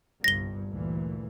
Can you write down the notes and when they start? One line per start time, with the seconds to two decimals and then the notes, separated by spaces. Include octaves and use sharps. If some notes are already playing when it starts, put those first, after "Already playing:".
0.24 G1 C2 G2 A#6 G7
0.69 D2 A#2 E3